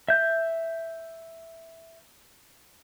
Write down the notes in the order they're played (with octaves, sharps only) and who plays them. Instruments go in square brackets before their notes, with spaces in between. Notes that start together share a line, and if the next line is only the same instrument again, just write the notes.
[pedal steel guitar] E5 G6